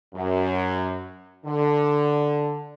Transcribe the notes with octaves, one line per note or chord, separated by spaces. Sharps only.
F#2
D3